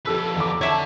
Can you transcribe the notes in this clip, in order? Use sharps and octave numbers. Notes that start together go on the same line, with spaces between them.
F2 G4 A4 B4 E6
E2 D6
D3 C#5 E5 A5